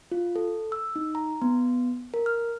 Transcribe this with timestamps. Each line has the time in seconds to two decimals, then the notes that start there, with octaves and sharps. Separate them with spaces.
0.12 F4
0.36 A4
0.72 E6
0.96 D#4
1.15 A#5
1.42 B3
2.14 A#4
2.26 F6